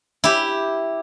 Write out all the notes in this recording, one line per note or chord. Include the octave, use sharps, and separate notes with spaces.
E4 G4